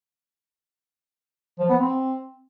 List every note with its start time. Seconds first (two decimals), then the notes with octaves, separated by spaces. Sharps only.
1.59 F3
1.69 B3
1.79 C4